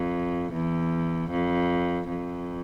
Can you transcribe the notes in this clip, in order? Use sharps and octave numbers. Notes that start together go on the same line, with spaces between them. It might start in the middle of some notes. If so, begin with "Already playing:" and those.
Already playing: F2
E2
F2
F2